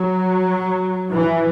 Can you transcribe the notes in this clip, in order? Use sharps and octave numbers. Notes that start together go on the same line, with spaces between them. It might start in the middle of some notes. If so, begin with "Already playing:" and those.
Already playing: F#3
E3